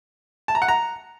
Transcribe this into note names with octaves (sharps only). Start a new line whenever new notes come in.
A5
A#5
F#5
A#5